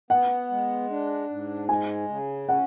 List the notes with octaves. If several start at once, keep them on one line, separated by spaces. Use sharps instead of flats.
B3 F#5
G#3
D4
G#2
G#3 G#5
C#3
C#4 F#5